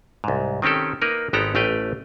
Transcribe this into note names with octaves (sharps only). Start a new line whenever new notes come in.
C2 G#2
D#3 C4 C#4 G4 A4
A#3 D#4 A#4 B4
G#1 G#3 B3 G4 A4 A#5
A1 A3 G4 B4 F5 G5